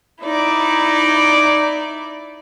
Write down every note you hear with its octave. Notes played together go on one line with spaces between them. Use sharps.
D#4 E4 D5